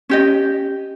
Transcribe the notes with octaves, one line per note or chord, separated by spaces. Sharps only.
C#4 G4 D#5